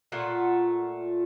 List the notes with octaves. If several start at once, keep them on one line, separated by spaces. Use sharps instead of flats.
A#2 A3 F4 F#5